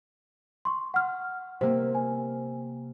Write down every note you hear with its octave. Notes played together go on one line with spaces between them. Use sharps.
C6 C#6
F#5 F6
C3 A#3 C5
G#5